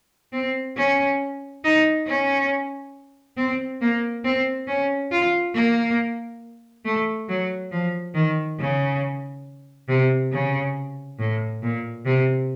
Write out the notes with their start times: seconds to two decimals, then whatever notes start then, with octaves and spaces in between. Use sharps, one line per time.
0.33 C4
0.77 C#4
1.64 D#4
2.07 C#4
3.37 C4
3.81 A#3
4.24 C4
4.68 C#4
5.11 F4
5.54 A#3
6.85 A3
7.29 F#3
7.72 F3
8.14 D#3
8.59 C#3
9.89 C3
10.32 C#3
11.19 A2
11.63 A#2
12.06 C3